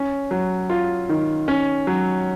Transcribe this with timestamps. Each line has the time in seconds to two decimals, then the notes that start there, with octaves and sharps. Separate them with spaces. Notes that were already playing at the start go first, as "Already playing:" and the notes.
Already playing: C#4
0.31 F#3
0.70 F4
1.09 D#3
1.48 C#4
1.87 F#3